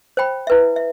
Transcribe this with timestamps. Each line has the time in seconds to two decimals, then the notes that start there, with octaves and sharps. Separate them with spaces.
0.17 C5 G5 B5
0.47 E4 B4 E5
0.76 E5